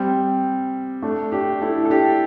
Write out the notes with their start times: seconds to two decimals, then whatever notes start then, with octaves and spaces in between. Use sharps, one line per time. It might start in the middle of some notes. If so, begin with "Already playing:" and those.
Already playing: G3 C4
1.02 A3 D4
1.32 D4 G4
1.61 E4 A4
1.85 A4
1.90 D4 G4